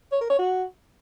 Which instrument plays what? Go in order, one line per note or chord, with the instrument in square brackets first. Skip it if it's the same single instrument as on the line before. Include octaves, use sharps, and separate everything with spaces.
[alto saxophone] C#5
A#4
C#5
F#4